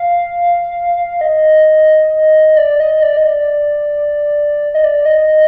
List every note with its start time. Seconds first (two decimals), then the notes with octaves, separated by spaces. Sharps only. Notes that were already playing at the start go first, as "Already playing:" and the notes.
Already playing: F5
1.21 D#5
2.57 D5
2.80 D#5
3.02 D5
3.17 D#5
3.26 D5
4.74 D#5
4.84 D5
5.05 D#5